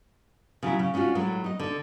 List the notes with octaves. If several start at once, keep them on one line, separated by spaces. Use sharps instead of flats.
C#3 F#3 E4
C#3
G#3 C#4 D4 F4 F#4
A2 F#3 G#3 A3
D#4 D#5
D3